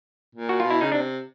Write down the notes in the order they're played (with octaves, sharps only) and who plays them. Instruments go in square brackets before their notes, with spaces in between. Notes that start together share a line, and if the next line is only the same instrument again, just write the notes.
[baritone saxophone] A#2
[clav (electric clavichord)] F#4
[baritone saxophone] B2 [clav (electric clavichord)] F4
[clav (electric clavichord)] E4
[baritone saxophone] C#3 [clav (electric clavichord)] D#4
[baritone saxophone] C3 [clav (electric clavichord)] D4